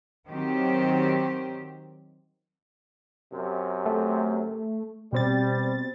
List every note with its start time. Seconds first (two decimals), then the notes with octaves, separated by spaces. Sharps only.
0.29 D#3 F#3 C4 G4
3.33 F#2 C3
3.86 A3
5.13 B2 G3 C4 A6